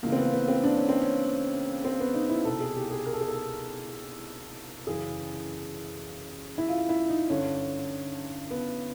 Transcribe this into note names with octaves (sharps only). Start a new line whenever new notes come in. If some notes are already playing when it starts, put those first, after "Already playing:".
C#2 C#3 E3 A#3
C4
B3
B3
C4
D4
C#4
C4
C#4
C4
B3
D#4
E4
C2 B2 A4
G#4
G4
G#4
A#4
A4
G#4
A4
F#2 C#3 E3 G#4
E4
F4
E4
D#4
G2 D3 C#4
B3